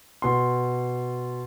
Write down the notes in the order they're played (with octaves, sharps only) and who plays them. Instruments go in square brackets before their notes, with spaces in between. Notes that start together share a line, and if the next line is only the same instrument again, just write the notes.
[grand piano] B2 C6